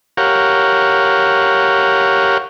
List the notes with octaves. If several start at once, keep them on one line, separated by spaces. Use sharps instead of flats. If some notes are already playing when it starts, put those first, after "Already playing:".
G4 A#4 C#5 F5 F#5